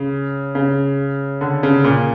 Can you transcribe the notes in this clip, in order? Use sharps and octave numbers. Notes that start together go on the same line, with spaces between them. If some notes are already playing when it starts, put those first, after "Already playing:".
Already playing: C#3
C#3
D3
C#3
A#2